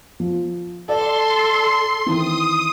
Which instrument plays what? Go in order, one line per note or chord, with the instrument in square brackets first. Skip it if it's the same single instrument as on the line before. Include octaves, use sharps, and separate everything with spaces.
[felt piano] F3
[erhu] A4 [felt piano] D5 [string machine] C6
[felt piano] D#3 E3 C4 [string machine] D#6